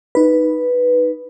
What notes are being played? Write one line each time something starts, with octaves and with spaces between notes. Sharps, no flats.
D#4 B4